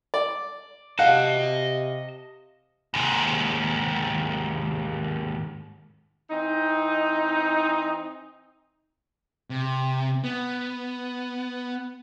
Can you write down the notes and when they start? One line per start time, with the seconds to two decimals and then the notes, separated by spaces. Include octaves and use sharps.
0.14 D5
0.99 C3 D#5 F5 F#5 A5
2.94 D#2 G#2
6.30 E3 C4 D#4
9.50 C3
10.24 B3